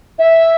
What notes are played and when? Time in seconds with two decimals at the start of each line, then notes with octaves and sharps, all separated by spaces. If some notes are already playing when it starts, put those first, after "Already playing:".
0.19 E5